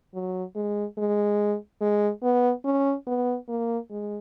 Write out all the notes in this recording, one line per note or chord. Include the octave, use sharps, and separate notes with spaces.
F#3
G#3
G#3
G#3
B3
C#4
B3
A#3
G#3